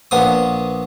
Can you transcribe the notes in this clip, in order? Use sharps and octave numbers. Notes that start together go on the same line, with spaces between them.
A#1 B3 D#6